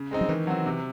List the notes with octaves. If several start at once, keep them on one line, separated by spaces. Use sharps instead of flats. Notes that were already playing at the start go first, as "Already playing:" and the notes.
Already playing: C#3
G#3 C4 D#4
F#3
D#3 E3
F#3 C4 F#4
C3